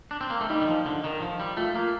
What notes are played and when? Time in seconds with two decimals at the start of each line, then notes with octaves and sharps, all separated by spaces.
0.11 D4
0.21 C4
0.30 A#3
0.41 A3
0.50 G3 D#4
0.62 D#3
0.67 F3
0.86 D3
1.04 D#3
1.22 F3
1.40 G3
1.57 A3 F4
1.75 A#3